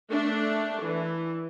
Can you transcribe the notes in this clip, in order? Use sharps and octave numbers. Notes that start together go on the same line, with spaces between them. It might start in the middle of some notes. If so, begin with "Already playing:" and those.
A3 D4
E3